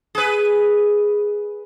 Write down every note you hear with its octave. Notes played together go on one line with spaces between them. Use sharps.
G#4 B4